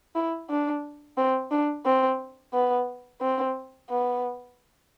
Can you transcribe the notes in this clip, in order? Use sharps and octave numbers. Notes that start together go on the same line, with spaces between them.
E4
D4
C4
D4
C4
B3
C4
B3